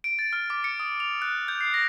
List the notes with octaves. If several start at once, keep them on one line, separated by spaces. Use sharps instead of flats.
D7
A6
F6
D6
C#7
D#6
F7
F#6
G6
C7
A#6